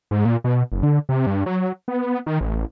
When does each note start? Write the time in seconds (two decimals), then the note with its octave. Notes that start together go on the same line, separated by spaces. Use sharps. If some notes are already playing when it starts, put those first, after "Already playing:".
0.11 G#2
0.25 A#2
0.44 B2
0.72 F#1
0.83 D3
1.09 C3
1.27 G2
1.46 F#3
1.88 B3
2.26 D#3
2.41 A1